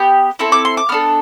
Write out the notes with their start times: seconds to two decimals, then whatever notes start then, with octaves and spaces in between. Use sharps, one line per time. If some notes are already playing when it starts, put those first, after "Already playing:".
Already playing: B3 G4
0.39 C4 E4 A4
0.52 D6
0.65 C6
0.77 D6
0.89 B3 D4 A4 F6